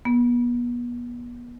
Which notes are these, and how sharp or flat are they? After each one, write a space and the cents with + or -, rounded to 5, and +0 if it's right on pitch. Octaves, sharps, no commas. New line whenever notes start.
B3 -35